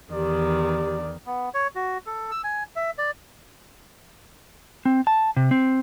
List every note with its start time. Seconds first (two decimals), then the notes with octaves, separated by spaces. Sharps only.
0.13 E2 D#3 G4 D5
1.26 B3
1.54 C#5
1.76 F#4
2.06 A4
2.31 E6
2.44 G#5
2.76 E5
2.98 D5
4.85 C4
5.07 A5
5.37 C3
5.51 C4